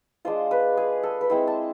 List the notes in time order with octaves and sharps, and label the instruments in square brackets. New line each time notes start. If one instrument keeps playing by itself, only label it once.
[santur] G#3 D4 F4 C5
B4
G#4
A4
B4
G#3 C4 E4 C5
A5